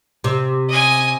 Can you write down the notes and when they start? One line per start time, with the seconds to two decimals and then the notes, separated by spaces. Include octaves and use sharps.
0.24 C3
0.69 D#5 G#5